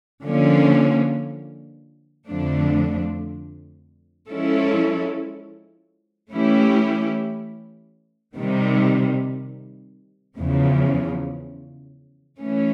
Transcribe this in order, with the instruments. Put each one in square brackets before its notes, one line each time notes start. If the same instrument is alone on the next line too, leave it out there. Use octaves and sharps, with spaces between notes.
[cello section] D3 F3 A#3 C#4
F2 D3 F3 A3 D4
F3 G#3 C#4 E4 A4
E3 A3 C#4 E4 G4
C3 D#3 G3
E2 C#3 F3
E3 A3 C#4